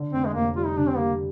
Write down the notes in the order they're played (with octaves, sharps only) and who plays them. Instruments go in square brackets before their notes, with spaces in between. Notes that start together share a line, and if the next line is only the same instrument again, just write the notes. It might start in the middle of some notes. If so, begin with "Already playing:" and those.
Already playing: [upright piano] D3
[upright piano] F1 [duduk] C4
[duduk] G#3
[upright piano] F1 [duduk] A#3
[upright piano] G3 [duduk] F4
[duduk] D#4
[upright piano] D3 [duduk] D4
[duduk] C4
[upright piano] G3 [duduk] A#3